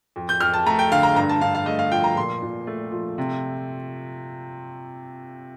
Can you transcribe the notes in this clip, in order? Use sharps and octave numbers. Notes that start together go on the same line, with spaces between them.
F2
G6
F2 F6
A5
A3 A#5
G5
D3 F5
A#5
G2 A#5
A5
G2 F5
F5
A3 D#5
F5
F3 G5
A#5
A#2 C6
A#2
A3
F3
C3